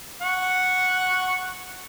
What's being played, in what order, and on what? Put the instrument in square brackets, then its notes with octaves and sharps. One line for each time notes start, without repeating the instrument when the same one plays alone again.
[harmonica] F#5 C#6